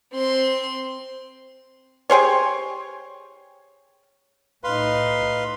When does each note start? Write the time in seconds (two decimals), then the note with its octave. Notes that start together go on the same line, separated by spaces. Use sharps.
0.13 C4 C6
2.10 G4 G#4 C5 C#5
4.64 A2 D#4 B4 F5 C6